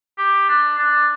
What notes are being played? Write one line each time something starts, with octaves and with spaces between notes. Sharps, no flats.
G4
D4
D4